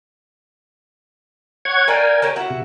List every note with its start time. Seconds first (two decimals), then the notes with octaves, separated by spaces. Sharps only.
1.65 C#5 F#5 G#6
1.88 A#4 D5 F5 G5 G#5 A#5
2.22 A#3 G4 C#5
2.36 E4 F#4
2.50 C3